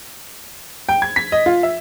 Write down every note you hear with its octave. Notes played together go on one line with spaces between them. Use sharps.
G5
G#6
B6
D#5
F4
E5